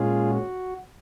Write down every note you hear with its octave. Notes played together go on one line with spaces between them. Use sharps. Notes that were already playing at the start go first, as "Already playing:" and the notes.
Already playing: A#2 G#3 C#4 F4 G#4
F#4